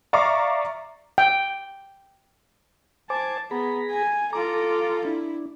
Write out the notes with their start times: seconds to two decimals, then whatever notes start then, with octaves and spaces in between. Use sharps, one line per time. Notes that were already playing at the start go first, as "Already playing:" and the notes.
0.13 D5 E5 F5 A#5 C#6 D6
1.18 G5
3.10 C5 G#5 A5 D6
3.51 B3 G#4 A#5 B5
3.91 G#5
4.33 F4 A4 A#5 D6
5.05 D4 E4